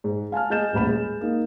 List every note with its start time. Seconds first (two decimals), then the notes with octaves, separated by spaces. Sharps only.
0.04 G#2
0.32 F5 G#5 A5 F6
0.50 G#3 D#5 G#5 G6 A6 E7
0.73 D#1 A1 B5 E7
0.87 G#3
1.21 A#3 D#4